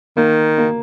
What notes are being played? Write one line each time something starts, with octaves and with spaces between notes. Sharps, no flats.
D#3 A#3
A#3